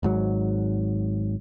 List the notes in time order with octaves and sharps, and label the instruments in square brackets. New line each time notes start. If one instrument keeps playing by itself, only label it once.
[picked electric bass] G#1 G#2 F#3